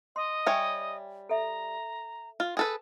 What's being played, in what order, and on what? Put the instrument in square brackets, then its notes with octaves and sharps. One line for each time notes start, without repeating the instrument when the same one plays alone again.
[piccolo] D#5 [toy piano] C6
[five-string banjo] G3 C#5 [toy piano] E5 G5 G#5
[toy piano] A4 E5 [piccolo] A#5
[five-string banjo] F4
G#4 A4 B4